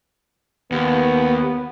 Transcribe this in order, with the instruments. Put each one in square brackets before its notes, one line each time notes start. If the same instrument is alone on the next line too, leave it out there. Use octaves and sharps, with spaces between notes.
[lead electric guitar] D#2 [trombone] B3